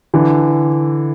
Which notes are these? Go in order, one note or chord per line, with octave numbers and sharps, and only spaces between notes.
D3 E3